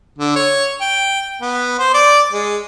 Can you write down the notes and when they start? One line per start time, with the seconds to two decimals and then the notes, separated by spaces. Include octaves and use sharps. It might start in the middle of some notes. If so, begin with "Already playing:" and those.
0.19 D3
0.36 C#5
0.81 G5
1.42 B3
1.79 C5
1.94 D5
2.33 G#3